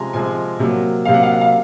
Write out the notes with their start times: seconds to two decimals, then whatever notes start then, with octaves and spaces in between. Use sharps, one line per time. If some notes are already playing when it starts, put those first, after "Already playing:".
Already playing: C3 F3 G#3 G#5 A#5 C6
0.13 C3 F3 G#3 G#5
0.59 C3 F#3 A#3
1.05 C3 F#3 A#3 F5
1.14 F#5
1.23 F5
1.31 F#5
1.41 F5